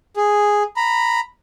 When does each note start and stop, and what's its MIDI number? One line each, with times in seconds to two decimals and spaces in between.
0.17 0.63 68
0.76 1.20 82
0.76 1.20 83